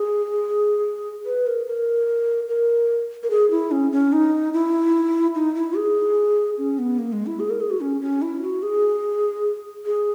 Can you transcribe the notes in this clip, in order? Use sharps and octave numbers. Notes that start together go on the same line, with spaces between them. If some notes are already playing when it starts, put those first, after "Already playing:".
Already playing: G#4
B4
A#4
A#4
A#4
A#4
G#4
E4
C#4
C#4
D#4
E4
D#4
E4
G#4
C#4
B3
A#3
G#3
E4
G#4
A#4
G#4
F#4
C#4
C#4
E4
F#4
G#4
G#4